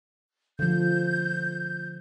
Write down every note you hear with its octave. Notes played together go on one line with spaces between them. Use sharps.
D3 F3 G6